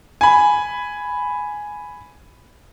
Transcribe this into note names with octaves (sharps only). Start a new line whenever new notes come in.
G#5 B5